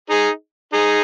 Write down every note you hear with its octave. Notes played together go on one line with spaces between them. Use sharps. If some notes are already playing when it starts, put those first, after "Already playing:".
D#4 G#4
D#4 G#4